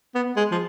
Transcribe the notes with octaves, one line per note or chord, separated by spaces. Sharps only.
B3
G#3
F3